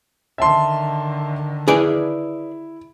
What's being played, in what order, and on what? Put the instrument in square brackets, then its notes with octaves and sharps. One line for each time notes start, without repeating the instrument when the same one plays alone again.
[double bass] D3 D#3 [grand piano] E5 A5 C6
[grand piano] E4 [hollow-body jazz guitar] G#4 B4 D5